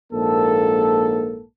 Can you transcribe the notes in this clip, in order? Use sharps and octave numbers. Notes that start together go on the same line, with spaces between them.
A#1 G#2 A#3 A4